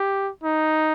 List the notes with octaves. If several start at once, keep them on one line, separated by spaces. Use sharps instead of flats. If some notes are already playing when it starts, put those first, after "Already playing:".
Already playing: G4
D#4